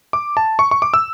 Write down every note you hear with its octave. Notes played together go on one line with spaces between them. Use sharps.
D6
A5
C#6
C#6
D6
E6